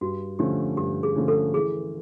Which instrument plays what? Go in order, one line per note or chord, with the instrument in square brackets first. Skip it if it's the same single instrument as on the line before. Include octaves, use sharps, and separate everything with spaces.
[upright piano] G2 [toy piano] F#4
[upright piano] D3 F3 A3 C#4 [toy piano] G4
[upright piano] G2 [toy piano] G4
[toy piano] G#4
[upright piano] D3 F3 A3 C#4
[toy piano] A4
[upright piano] E3 [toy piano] G#4